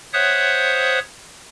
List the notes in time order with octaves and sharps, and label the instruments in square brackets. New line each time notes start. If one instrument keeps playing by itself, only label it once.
[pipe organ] C5 C#5 E5 F#5 D#6 F#6